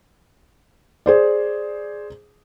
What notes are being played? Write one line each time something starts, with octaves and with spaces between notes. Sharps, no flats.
G#4 C5 D5